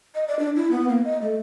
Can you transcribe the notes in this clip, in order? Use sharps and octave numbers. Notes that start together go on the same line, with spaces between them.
D#5
D5
D4
E4
B3
A#3
D#5
A3